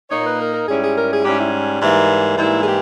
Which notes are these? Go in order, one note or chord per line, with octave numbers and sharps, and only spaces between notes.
A#2 A#3 D#4 C#5
B4
A#4
A#4
G#2 G3 C#4 E4 G#4
G#4
A#4
G#4
G#2 G3 C#4 E4 G4
E4
G#2 E3 G3 A#3
G#2 E3 G3 A#3 E4
G#4
G4